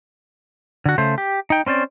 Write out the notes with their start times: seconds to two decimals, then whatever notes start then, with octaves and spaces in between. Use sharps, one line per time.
0.86 D3 F#4
0.98 C#3 A3 C5
1.18 G4
1.50 D#4 G5
1.66 C4 C#4 C5 D5